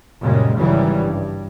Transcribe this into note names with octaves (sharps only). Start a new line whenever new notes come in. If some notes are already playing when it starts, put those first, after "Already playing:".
F#2 A#2 C#3 G3 G#3
G#1 G#2 C#3 E3 F#3 G3
G2